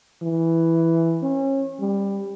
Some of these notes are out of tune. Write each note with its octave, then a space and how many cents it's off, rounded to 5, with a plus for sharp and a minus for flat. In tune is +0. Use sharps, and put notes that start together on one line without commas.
E3 +0
C#4 -30
G3 +15